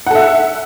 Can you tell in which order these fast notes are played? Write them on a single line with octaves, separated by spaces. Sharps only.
F#5 A4 E5